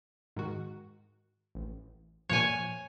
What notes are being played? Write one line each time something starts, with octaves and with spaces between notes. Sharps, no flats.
G#2 D#3 F#4
A1
A#2 F3 C#5 G#5